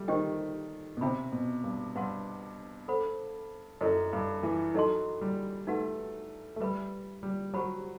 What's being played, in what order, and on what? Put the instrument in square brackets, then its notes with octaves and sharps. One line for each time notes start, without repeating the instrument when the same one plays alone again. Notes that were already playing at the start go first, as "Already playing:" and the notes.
Already playing: [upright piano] G3 A3
[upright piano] D#3 [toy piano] G4 C5 D#5 G5
[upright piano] B2
[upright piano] C3 [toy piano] C5 E5 G5 B5
[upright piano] B2
G2
[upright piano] G2 [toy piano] B4 F#5 A5 C6
[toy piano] A4 C5 F#5 B5
[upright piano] F#2 [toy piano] E4 A4 D#5
[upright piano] G2
E3
[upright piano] F#3 [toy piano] D#4 A4 D#5 A5 C6
[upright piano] G3
[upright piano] A3 [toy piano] D#4 F#4 B4 F#5
[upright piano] A3
[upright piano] G3 [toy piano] B4 E5 B5
[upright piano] G3
[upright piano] F#3 [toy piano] G4 C5 F#5 B5